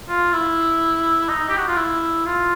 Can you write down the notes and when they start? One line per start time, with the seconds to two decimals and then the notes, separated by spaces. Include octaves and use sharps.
0.09 F4
0.33 E4
1.29 D#4
1.49 G4
1.58 F#4
1.67 F4
1.77 E4
2.25 F4